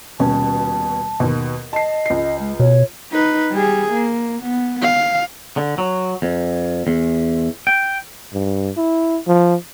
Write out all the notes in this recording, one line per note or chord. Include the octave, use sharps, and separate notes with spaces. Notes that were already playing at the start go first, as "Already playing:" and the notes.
D#1 B2 C#4 A5
D#2 B2
D#5 A5 C7
C#2 C7
G#3
B2 C#5
D#4 B4
G3 G#4
A#3
B3
F5
D3
F#3
F2
E2
G5
G2
E4
F3